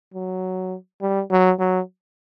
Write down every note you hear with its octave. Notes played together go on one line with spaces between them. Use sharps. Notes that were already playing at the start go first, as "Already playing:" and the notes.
F#3
G3
F#3
F#3